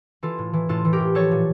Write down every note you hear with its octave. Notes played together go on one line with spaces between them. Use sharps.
E3 F4 A4
A2
E3
A2 F4 A4
E3
G4 A#4
A2
F3 A4 C#5
A#2